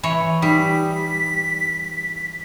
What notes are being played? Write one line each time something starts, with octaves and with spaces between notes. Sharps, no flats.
E3 C#5
G3 D#4 G4 B6